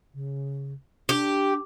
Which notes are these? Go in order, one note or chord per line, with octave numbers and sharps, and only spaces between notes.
C#3
D4 G4